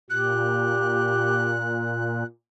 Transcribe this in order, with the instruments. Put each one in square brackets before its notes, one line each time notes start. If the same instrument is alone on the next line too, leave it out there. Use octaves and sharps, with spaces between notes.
[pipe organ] A#2 [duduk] G4 [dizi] F#6